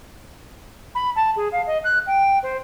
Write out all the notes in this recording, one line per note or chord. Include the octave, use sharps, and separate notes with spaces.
B5
A5
G#4
F5
D#5
F#6
G5
C5